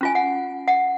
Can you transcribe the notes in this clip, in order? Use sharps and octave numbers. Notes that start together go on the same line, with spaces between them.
C#4 F4 G#5
F#5
F#5